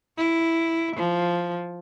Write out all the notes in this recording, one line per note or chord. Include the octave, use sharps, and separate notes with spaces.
E4
F3